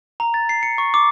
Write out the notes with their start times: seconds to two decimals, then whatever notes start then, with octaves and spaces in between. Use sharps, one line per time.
0.20 A#5
0.34 A6
0.49 C7
0.63 C#7
0.78 C#6
0.94 D6